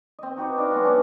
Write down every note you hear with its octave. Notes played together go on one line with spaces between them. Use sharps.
C4 D#5
D#4 F#4 G4 B4
D4 D#5 F5 D6
F#3 G#3 B3 F#4
C#4 D4 F#4